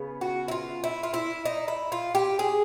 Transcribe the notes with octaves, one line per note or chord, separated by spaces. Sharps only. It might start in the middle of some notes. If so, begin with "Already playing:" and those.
Already playing: C#3 B3
F#4
E4
F4
E4
F4
E4
D#4
E4
F4
G4
G#4